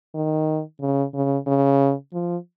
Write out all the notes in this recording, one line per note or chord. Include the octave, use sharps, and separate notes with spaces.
D#3
C#3
C#3
C#3
F3